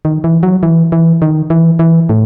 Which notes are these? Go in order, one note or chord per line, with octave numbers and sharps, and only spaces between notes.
D#3
E3
F#3
E3
E3
D#3
E3
E3
A2